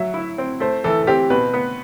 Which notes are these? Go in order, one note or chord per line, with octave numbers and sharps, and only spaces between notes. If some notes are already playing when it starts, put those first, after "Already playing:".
Already playing: F#3 E5
E4
C4
A3 C5
E3 A4
A4
C4 G4
B2 B4
B3